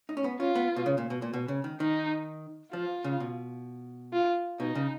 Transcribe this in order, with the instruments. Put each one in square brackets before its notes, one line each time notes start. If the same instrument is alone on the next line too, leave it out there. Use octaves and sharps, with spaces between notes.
[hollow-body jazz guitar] D#4
C#4
B3
[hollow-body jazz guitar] C#4 [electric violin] F4
[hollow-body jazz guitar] B3
B2
C#3
A#2
B2
A#2
B2
C#3
D#3
[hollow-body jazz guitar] D#3 [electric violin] D#4
[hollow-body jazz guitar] F3 [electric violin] F4
[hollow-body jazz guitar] C#3
B2
[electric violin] F4
[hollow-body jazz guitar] B2 [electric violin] D#4
[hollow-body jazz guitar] C#3